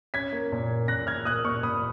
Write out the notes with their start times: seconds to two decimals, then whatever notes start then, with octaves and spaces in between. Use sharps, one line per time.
0.14 C#4 G#6 B6
0.33 A#3
0.52 A#2
0.70 A#3
0.88 A#2 F#6 A#6
1.07 A#2 F6 G#6
1.25 A#3 D#6 F#6
1.44 A#2 C#6 F6
1.63 A#2 B5 D#6